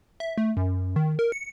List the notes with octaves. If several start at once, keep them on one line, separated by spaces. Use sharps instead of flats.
E5
A3
F#2
D#3
A#4
C#7